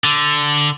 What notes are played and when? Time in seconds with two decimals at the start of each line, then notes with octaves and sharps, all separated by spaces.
0.04 D3